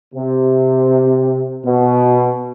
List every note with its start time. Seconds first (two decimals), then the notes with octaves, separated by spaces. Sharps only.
0.14 C3
1.66 B2